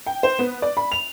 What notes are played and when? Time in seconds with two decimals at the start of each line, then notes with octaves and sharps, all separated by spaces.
0.06 G5
0.23 C5
0.39 B3
0.62 D5
0.77 B5
0.92 F7